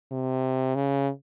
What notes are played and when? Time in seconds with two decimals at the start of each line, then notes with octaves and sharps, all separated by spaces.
0.11 C3
0.75 C#3